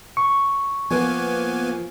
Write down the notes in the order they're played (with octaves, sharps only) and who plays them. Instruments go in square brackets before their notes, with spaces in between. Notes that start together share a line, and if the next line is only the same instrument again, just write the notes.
[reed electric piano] C#6
[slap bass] F3 [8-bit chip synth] A#3 B3 G#5